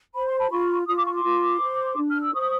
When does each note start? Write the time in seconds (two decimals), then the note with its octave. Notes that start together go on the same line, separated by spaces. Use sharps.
0.15 C5 B5
0.27 C6
0.39 A5 B5
0.51 F4 B5 C#6
0.88 F4 D#6
0.96 D6
1.05 C#6
1.14 C6 D6
1.24 F4
1.61 C5
1.97 D4
2.09 F6
2.22 E6
2.34 C5 C#6 D#6